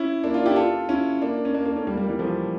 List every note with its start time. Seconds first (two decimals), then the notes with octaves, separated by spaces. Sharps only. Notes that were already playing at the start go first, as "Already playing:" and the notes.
Already playing: C#4 E4
0.24 A#3 D4
0.34 D4 F4
0.46 E4 G4
0.56 F4 A4
0.89 C#4 E4
1.22 A#3 D4
1.45 C#4
1.54 A#3 D4
1.65 A#3 D4
1.76 A3 C#4
1.87 G3 A#3
1.97 G3 A#3
2.09 E3 G3
2.19 F3 A3